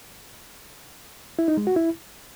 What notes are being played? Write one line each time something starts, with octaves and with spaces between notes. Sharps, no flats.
E4
D#4
G#3
F#4
E4